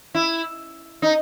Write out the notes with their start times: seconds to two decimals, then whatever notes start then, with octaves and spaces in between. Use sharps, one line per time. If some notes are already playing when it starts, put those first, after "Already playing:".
0.15 E4
1.02 D#4